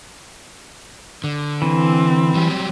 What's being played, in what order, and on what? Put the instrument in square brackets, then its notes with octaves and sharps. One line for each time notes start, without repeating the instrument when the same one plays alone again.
[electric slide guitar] D3
[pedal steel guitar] E3 [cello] C4
[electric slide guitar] F#3 G3 G4